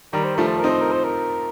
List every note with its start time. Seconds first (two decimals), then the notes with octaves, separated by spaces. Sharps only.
0.13 D#3 G3 A#4
0.24 C5
0.36 F3 A3 A#4
0.47 C5
0.59 A#4
0.64 C4 D#4
0.70 C5
0.81 A#4
0.92 C5
1.04 A#4